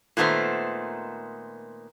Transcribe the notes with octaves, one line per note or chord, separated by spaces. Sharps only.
A#2 D#3 A3 B3 C5